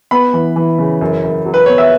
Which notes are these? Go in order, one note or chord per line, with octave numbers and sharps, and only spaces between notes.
B3 B5
E3
E3
C#3
F#2
F#2
F#3
B4
B3 C#5
E5